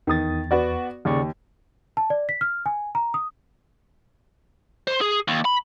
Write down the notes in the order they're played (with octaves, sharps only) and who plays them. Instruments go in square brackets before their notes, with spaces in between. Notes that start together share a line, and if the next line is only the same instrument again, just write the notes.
[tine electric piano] E2 A6 [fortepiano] D#3 D#6
[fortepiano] B3 F#4 D5
[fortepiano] D#2 [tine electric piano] C#3 D5 C#6
[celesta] A5
D5
B6
F6
G#5
A#5
D#6
[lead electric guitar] C5
G#4
D#2
B5